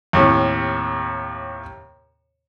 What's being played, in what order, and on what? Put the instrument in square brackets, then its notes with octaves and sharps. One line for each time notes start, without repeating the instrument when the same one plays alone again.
[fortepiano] D#2 A2 C3